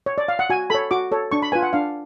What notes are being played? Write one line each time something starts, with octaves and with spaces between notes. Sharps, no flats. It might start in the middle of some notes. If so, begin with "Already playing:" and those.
C#5
D5
F5
F#5
F#4 G#5
A4 C#5 B5
F#4 D6
A4 C#5
D4 C#6
B5
F4 B4 G#5
F#5
D4 F5